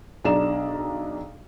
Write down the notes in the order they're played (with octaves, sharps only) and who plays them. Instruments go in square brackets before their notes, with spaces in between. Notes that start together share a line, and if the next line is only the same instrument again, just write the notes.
[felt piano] B1 D4 G#4 D5 A#5 E7